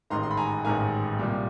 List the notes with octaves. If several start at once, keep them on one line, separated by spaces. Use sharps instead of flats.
A1 G#2 D#3 A#5 C6
C6
B5
G#5 A#5
A1 G#2 D#3 G#5 A#5
C2 A#2 G3